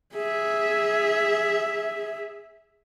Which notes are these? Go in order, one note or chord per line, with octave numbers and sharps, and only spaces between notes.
G#4 E5